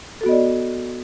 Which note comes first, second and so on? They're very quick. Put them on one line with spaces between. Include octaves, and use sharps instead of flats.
A4 F#4 B3 D#5 D5